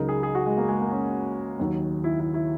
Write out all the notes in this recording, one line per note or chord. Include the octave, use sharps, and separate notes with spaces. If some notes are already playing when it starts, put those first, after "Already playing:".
Already playing: C#2 C#3 F#3 D#4 A#4
G#4
G#4
F#4
G#3
A#3
G#3
A#3
C#4
D#2 D#3 F#3
E4
E4
E4